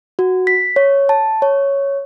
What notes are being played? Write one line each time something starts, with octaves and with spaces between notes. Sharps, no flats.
F#4
B6
C#5
A5
C#5